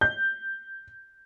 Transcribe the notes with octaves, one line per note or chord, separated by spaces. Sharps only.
G6